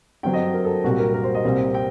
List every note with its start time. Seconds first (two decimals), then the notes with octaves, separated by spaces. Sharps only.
0.23 G2 D3 F#3 C4 G5
0.34 D#5
0.54 A#4
0.64 A4
0.84 C2 A#2 G3 F#4
0.99 A#4
1.14 A#4
1.24 C5
1.35 D#5
1.44 C2 A#2 G3 C4
1.74 G5